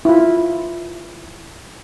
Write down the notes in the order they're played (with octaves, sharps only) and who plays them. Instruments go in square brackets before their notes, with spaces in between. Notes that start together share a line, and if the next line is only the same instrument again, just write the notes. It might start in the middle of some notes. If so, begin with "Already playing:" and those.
[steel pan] E4 F4